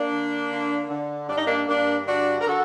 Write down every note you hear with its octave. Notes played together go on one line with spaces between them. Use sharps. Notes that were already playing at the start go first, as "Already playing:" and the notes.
Already playing: A#3 D4
D3
D3
D3
G2 D4
D#4
A#3 D4
G2 A#3 D4
D3 D4 F#4
A#4
D3 F#4 A4